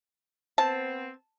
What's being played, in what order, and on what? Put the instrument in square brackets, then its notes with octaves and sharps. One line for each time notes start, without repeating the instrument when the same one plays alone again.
[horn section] B3 C4 [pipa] A5